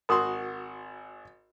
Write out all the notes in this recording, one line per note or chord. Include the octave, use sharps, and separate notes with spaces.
G#1 F#4 A#4 B5 C6 D#6